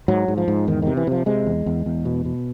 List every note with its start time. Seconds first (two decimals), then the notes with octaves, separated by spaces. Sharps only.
0.08 G#2 F#3
0.28 G#2
0.37 F3
0.48 G#2
0.67 E2 D#3
0.82 C3 D#3
0.97 E3
1.07 C3 F3
1.26 C3 G#3
1.46 E2
1.66 E2
1.86 E2
2.05 B2
2.25 B2